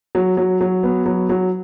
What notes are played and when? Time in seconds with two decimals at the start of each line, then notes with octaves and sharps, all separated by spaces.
0.15 F#3
0.37 F#3
0.61 F#3
0.83 B3
1.06 F#3
1.29 F#3